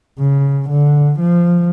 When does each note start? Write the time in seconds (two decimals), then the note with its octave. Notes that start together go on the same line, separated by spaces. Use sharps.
0.19 C#3
0.69 D3
1.20 F3